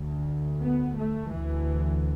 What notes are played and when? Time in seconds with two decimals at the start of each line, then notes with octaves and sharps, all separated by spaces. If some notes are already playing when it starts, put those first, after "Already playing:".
Already playing: D2
0.60 B3
0.96 A3
1.32 D2 E3